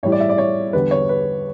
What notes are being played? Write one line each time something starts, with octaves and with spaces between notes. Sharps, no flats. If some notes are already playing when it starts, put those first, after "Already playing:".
A2 E3 G3 C#5
D5
E5
D5
C#5
E2 D3 G3 B4
C#5
B4